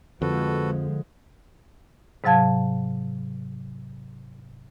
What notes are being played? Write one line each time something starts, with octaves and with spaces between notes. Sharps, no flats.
F2 D3 F3 G#3 F#4 A4 B4
G#2 C3 F#3 F5 A5 G#6